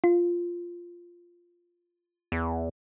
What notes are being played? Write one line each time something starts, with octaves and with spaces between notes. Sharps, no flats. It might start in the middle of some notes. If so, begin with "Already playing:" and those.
F4
E2